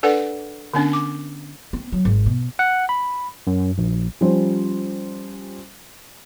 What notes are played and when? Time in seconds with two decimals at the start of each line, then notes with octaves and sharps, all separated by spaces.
0.03 D4 A4 B4 D5 F#5
0.73 D3 B3 C#4 D4
0.93 D6
1.73 C4
1.92 F#3
2.05 G#1
2.26 B2
2.59 F#5
2.89 B5
3.47 F#2
3.78 A#1
4.21 F3 G3 C#4 C5